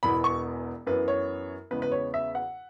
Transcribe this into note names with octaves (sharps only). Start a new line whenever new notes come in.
E1 E2 E3 B3 B5
C#6
F#2 E3 B3 B4
C#5
E2 C#3 G#3 B3 B4
B4
C#5
E5
F#5